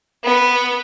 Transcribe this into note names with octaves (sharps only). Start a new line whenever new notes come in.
B3